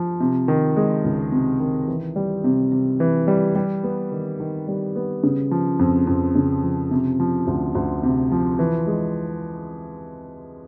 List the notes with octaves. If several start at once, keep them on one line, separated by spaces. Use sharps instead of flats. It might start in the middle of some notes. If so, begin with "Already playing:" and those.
Already playing: F3
C3
D#3
G#3
C#2
C3
D#3
E3
G3
C3
C3
E3
G3
G3
B3
D#3
D#3
G3
B3
C#3
F3
F2
F2
C#3
F3
C3
F3
D2
D2
C3
F3
E3
G#3